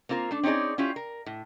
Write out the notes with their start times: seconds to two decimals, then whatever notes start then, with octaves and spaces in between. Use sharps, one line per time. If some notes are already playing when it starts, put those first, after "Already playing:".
0.09 A#3 C4 F4 A#4
0.31 A3 D4
0.43 C4 C#4 D#4 G#4 D5
0.78 C#4 E4 F4 G4
0.96 A#4
1.26 A2